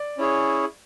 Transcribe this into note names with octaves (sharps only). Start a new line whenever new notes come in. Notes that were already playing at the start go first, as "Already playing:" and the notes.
Already playing: D5
C#4 E4 G#4 C#5